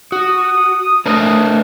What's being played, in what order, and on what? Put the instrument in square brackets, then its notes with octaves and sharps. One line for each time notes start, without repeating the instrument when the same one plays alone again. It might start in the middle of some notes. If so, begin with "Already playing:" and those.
[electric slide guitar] F#4 [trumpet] D#6
[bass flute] A3 [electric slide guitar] D4 A#4 B4